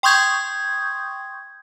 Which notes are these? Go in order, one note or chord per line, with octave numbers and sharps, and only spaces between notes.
G5 C6 C#6 D#6 G6 G#6